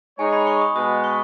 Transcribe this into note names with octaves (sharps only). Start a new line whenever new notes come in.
G#3 D#4 G#4 C#5 G#5
B5
C#6
D#6
B2 G#3 B3 D#6
C#6